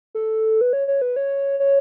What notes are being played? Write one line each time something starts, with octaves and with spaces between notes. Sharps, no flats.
A4
B4
C#5
C#5
B4
C#5
C#5